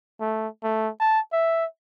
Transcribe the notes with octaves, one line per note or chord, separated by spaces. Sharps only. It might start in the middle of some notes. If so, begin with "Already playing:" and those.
A3
A3
A5
E5